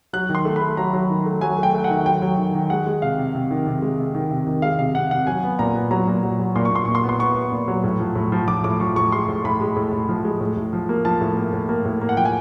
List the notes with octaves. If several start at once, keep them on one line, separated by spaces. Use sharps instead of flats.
F#3 F#6
D#3
C6
A3
B5
A3
F#3 A#5
F#3
D#3
A3
F#3 G#5
A3
G5
A3
F#5
D#3
F#3 G5
F#3
D#3
D#3
G#3 F#5
G#3
C3 F5
C3
C3
D#3
C3
G#3
C3
D#3
C3
D#3
G#3 F5
C3 F5
C3 F#5
C3 F#5
F#3 G#5
B3
A#2 A#5
B3
F#3 A#5
A#2
F#3
F#3
A#2 C6
C#6
A#2 C6
A#2 C#6
C6
B3
C6
B3 C#6
B3
A#2
F#3
A2
F3
A2
F3
F3 D6
A2 D6
F3 C#6
A2 C#6
G#3 C6
A2
A2 B5
G#3
A2
A2
F3
G#3
A2
A2
F3
A#3
F3 A5
A2
A#3
A2
A#3
A2
A#3
F#5
F3 G5
G#5